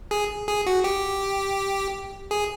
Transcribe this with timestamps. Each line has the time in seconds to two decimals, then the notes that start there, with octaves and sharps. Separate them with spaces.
0.11 G#4
0.48 G#4
0.66 F#4
0.84 G4
2.31 G#4